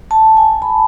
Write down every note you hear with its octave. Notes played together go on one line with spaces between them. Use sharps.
A5
G#5
B5